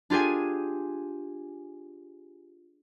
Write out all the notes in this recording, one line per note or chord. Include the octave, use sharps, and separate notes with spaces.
D4 F4 G4 G#4 G#5